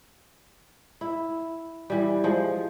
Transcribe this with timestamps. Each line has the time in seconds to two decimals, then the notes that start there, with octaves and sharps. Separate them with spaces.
1.01 E4
1.90 E3 G3
2.24 F3 G#3